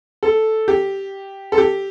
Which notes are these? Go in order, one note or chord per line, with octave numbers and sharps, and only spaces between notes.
A4
G4
A4
G4